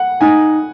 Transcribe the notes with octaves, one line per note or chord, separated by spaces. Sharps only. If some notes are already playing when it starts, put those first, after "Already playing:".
Already playing: F#5
D#4 G#5